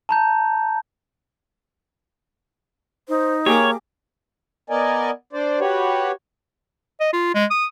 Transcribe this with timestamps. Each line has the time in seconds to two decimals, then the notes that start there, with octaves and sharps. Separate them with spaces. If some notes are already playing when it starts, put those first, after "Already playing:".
0.09 A5 A#5 G6
3.09 D#4 C5
3.46 A#3 G4 G#4 C#5 D6
4.70 B3 A#4 D5 D#5 G#5
5.33 D4 C5 D5
5.60 F#4 G4 B4 C#5
7.00 D#5
7.13 F4
7.35 G#3
7.51 D#6